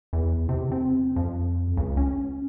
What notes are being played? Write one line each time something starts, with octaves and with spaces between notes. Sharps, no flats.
E2
C3
C4
F2
C#2
C#4